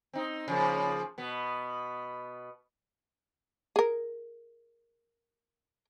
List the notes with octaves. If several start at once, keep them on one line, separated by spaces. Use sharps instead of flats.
C4 D#4
C#3 F3 A#3
B2 B3
G#4 A#4